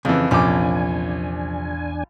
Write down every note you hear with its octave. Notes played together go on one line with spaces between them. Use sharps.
F2 C#3 E3
A#1 E2 C3 F3 C#4 D4 G#5 D6